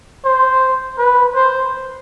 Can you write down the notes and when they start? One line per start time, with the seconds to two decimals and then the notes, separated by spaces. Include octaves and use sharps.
0.25 C5
0.98 B4
1.35 C5